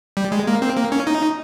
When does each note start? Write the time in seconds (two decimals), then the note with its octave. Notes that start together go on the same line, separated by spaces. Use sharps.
0.17 G3
0.32 G#3
0.47 A#3
0.62 C4
0.77 A#3
0.92 C#4
1.07 D#4